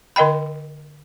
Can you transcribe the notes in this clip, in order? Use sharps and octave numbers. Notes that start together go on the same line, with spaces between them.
D3 A#4 D#5 G5 B5